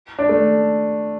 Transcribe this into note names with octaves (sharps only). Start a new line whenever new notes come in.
D4
A3